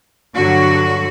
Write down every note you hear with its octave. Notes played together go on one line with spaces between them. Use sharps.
G2 D3 F#3 F#4